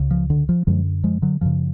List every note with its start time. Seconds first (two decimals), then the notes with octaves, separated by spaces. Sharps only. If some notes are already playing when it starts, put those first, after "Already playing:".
Already playing: C#2 C#3
0.11 F3
0.30 D3
0.49 F3
0.67 F#2 D3 F3 G#3
1.04 F3 G#3
1.22 D3 F#3
1.41 F#2 C#3 F3